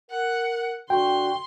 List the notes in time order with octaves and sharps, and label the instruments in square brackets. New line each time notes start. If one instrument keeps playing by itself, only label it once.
[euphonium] A#4 [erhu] F#5
[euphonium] D3 [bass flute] F#4 [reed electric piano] G5 [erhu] C6